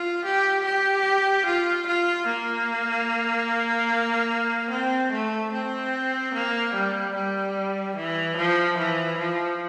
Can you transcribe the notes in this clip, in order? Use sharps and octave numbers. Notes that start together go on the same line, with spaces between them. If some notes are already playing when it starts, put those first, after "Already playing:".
Already playing: F4
G4
G4
F4
F4
A#3
C4
A3
C4
A#3
G3
G3
E3
F3
E3
F3